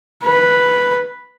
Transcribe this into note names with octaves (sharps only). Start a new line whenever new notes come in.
B4